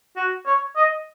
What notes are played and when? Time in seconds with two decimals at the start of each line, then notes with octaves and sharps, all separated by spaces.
0.16 F#4
0.46 C#5
0.76 D#5